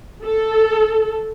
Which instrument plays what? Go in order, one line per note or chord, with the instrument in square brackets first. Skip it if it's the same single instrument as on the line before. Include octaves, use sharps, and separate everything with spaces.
[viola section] A4